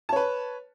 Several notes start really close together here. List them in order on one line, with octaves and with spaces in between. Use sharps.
A5 C#5 B4